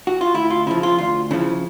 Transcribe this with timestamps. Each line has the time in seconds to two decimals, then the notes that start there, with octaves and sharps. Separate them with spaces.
0.07 F#4
0.21 F4
0.34 D2 E4
0.50 F4
0.67 C#3 F3 E4
0.83 F4
0.98 D2 F4
1.31 C#3 F3 E4